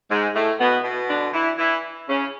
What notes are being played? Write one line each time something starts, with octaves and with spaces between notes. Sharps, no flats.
G#2 G#3
A2 A3
B2 B3
B2
D3 D4
E3 E4
E3 E4
C#3 C#4